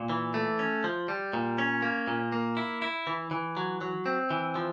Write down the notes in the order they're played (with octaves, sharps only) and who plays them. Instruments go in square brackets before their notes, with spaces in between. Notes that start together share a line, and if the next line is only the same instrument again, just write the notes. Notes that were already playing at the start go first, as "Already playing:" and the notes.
Already playing: [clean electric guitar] A#2
E3
A3
C#4
F3
G3
A#2
C#4
A#3
A#2
A#3
E4
E4
E3
E3
F#3
F#3
C4
E3
F3